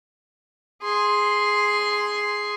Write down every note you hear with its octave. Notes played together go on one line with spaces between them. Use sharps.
G#4 C6